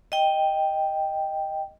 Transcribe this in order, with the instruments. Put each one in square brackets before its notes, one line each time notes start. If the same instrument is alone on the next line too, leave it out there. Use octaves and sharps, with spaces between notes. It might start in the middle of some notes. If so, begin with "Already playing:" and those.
[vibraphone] D#5 G5